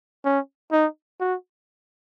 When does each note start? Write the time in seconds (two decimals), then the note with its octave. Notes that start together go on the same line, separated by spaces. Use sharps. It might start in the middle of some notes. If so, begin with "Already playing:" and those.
0.25 C#4
0.72 D#4
1.20 F#4